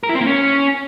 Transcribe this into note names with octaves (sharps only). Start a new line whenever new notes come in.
A#4
E4
C4
A#3
C#4